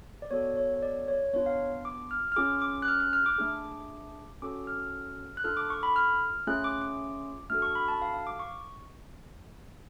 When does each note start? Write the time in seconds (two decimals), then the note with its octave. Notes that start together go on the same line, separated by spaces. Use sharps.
0.22 D5
0.31 B3 F#4 A4 C#5
0.57 C#5
0.75 C#5
0.82 D5
1.08 C#5
1.33 B3 D4 F4 C#5
1.46 F5
1.85 D6
2.11 F6
2.32 F6
2.36 C#4 F4 G#4 D6
2.62 D6
2.82 F#6
2.88 F6
3.00 F#6
3.13 F6
3.26 D6
3.38 A3 D4 G#4
4.42 C#4 F#4 A4 D6
4.67 F6
5.37 F#6
5.44 D4 F4 A4 F6
5.57 D6
5.70 C#6
5.83 B5
5.96 F6
6.47 A3 C#4 F4 G#4 F#6
6.64 D6
6.81 D6
7.50 A3 D4 F#4 A4 F6
7.62 C#6
7.75 B5
7.88 A5
8.02 F5
8.14 F5
8.27 D6
8.40 C#6